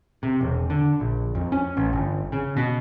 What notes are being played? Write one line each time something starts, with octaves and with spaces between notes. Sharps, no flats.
C3
E1
D3
A#1
F2
C#4
A1
G1
C#3
B2